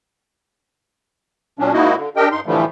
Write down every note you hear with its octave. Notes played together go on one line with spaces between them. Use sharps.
A#2 F#3 C#4 D4
G#2 A#3 D#4 E4 F#4 D#5
D3
D4 G4 A#4 D#5 G5
G2 D#4 C6
A2 D3 E3 F3 G3 A3